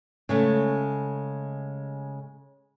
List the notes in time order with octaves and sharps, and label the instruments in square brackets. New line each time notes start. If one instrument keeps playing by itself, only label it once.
[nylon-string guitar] C#3 G#3 A3